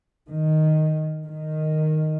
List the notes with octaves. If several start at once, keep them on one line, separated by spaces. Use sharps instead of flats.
D#3
D#3